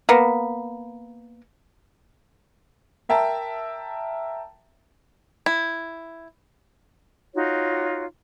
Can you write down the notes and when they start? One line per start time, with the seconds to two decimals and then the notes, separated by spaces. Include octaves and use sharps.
0.09 A#3 B3
3.09 A#4 E5 G5 A5 A#5
5.46 E4
7.34 D#4 F4 F#4 C#5